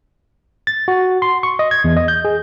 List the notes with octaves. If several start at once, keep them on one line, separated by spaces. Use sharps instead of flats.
A6
F#4
C6
C#6
D#5
G#6
E2
D#5
G6
G#4